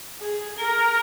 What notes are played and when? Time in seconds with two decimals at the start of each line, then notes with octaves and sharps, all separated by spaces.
0.21 G#4
0.58 A#4